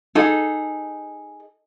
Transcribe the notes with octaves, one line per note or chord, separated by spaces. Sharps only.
D#4 G#4 A4